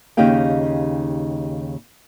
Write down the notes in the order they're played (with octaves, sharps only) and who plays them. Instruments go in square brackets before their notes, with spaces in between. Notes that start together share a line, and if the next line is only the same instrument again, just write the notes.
[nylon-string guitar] D#2 C#3 D#4 G4 F5 G5